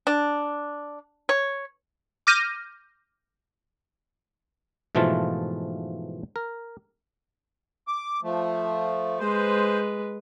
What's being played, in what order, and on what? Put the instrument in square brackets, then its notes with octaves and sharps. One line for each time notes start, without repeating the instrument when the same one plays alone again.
[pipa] D4
C#5
[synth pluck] D6 F6 G6 A#6 D#7
[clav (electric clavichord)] G#2 B2 E3 F3 A3 F4
A#4
[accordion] D6
F3 A3
[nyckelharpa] G#3 B4 [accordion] C5